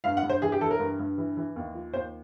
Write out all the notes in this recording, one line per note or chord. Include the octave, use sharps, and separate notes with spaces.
G2 F5
F#5
G2
C5
E3 G#4
G4
E3 A4
A#4
G2
G2
E3
E3
D#2
F3
D#2 C5